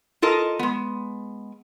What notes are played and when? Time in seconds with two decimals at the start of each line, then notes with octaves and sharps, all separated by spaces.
0.22 F4 A4 A#4 D#5
0.59 G#3 B3